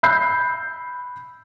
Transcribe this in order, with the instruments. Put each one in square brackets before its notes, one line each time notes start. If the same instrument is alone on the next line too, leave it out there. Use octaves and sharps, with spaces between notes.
[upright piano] B5 E6 F#6 G6 C7